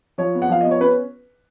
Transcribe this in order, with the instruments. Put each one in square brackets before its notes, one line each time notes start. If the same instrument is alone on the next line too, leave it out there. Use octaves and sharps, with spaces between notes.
[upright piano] F3 C#5
B3
F#5
F3 F5
B3 D#5
C#5
C#4 B4